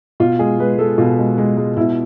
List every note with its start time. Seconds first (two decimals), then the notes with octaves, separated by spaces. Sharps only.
0.20 B2 F4
0.39 G#3 G#4
0.59 G#3 B4
0.78 G#3 A4
0.98 B2 F4
1.19 G#3
1.38 G#3
1.57 G#3
1.77 B2 E4